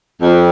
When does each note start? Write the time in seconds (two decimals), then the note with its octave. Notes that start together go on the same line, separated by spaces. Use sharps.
0.21 F2